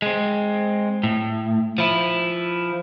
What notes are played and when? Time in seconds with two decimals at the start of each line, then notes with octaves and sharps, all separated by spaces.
0.02 G#3 C4
1.03 A2
1.78 F3 E4